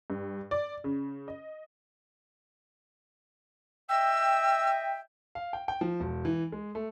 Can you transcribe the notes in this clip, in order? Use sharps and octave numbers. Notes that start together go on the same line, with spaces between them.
G2
D5
C#3
D#5
D#5 E5 G5 E6
F5
G5
G5
F3
E1
E3
G#3
A3